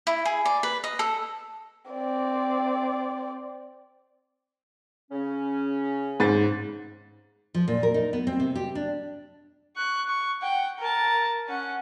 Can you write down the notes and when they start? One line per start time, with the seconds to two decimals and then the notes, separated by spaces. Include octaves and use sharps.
0.07 E4
0.25 G#4
0.45 D5
0.63 B4
0.84 D#5
0.99 A4
1.91 C4 D5
5.11 C#3 C#4
6.20 G#2 A6
7.54 F3
7.68 A#2
7.83 A#4
7.94 D#4
8.13 B3
8.27 C4
8.40 C3
8.55 G4
8.75 D4
9.76 C#6 F#6
10.08 C#6
10.42 F#5 G5
10.80 A#4 A5
11.48 C#4 F#5